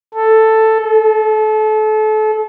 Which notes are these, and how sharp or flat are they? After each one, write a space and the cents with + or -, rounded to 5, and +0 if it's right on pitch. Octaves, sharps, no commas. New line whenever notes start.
A4 +5
A4 -30